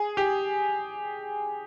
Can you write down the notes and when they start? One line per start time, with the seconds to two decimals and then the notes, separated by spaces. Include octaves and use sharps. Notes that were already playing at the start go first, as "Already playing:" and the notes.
Already playing: G#4
0.17 G4